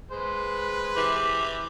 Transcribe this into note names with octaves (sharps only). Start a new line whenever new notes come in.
G#3 B4 C5
E3 G4